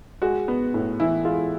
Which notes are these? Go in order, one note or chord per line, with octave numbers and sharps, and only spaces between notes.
G#3 F#4
B3
A2
E3 E4
G#3 F4